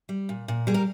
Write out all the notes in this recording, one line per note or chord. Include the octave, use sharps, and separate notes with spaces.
G3
A#2
A#2
G3 G#4
A#4